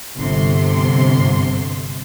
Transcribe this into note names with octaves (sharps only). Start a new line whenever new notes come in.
G1 C3 C6